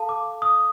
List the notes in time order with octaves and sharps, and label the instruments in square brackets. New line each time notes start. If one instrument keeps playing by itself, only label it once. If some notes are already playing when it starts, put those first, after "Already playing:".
Already playing: [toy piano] A4 F5 A5
[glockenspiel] D6
D#6